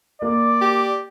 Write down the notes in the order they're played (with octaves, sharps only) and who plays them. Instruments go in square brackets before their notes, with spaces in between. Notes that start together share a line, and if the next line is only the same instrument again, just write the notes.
[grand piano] A#3 [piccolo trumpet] D5
[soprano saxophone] G4